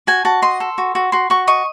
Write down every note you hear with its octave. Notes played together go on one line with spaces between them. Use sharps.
F#4 G#5
F#4 A5
D#5 C6
A4
F#4
F#4
F#4 C6
F#4 C#6
D#5 C#6